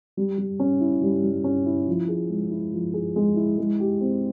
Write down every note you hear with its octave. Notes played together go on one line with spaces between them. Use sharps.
G3
G3
C#4
E4
G3
G3
C#4
E4
F3
G#4
G#3
E4
F3
G#4
G#3
E4
G#3
G4
C4